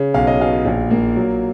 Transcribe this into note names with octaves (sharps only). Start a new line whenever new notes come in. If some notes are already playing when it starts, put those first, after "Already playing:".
Already playing: C#3
B1 F5
D#5
B2 F5
A#1
A#3
F#3